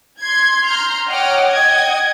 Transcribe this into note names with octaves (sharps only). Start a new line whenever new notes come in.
C6 G#6
A#5 C6 F6 G6
C#5 D#5 F#5 G5 D6 F6
D#5 F#5 G5 G#6